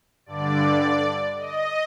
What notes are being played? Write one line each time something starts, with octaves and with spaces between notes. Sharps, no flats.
G2 D3 D5
D#5